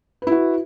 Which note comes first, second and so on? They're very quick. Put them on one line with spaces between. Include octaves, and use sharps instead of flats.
B4 E4 F#4